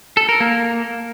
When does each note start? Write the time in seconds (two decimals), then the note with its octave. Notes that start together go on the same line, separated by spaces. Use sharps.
0.17 A4
0.29 A#4
0.40 A#3